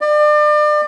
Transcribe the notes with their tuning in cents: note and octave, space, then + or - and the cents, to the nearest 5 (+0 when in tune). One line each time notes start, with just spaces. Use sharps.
D5 +35